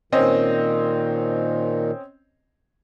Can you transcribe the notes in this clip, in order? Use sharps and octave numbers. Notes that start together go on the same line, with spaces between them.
A#2 D#3 C4 C#4 D#5